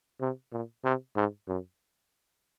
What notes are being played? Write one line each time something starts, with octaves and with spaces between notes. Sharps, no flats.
C3
A#2
C3
G#2
F#2